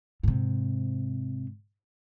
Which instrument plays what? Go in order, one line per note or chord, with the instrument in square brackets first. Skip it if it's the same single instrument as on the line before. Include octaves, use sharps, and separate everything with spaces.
[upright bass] G#2 C3